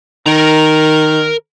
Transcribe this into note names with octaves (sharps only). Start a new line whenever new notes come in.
D#3 A#4 A#5